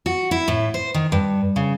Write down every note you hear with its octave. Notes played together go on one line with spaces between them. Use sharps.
F#4
E4
A2
C5
D#3
G2
C#3